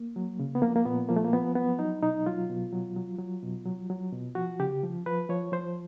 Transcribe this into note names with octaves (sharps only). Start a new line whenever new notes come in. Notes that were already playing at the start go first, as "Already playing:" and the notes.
Already playing: A#3
F#3
C#3
B3
F3 A#3
A#3
A#2 B3
F3 A#3
A3
A#3
F3 B3
F#3 B3
F#3 D#4
B2 D#4
F#3 F4
B2
F#3
F#3
F#3
B2
F#3
F#3
B2
F3 F#4
C#3 G4
F3
F3 B4
F3 C#5
F3 C5